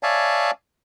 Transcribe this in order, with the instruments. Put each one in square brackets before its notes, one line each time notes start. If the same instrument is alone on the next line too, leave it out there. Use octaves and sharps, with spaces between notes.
[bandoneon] C#5 D5 E5 F5 G#5 A5